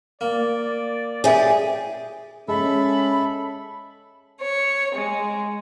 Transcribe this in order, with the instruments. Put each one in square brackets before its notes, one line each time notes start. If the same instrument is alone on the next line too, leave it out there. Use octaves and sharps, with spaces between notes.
[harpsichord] A#3 [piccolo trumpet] D5
[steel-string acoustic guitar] G4 G#4 [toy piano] C#5 E5 G#5
[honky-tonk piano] G#3 [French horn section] C#4 [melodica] A4 E5 [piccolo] B5
[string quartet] C#5
G#3